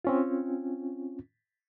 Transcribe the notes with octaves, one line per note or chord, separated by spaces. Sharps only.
C4 C#4 F4